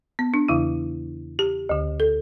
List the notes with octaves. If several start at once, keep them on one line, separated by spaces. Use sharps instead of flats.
B3
D4
E2 C#3 E3 E4
G4
D2 D3
A4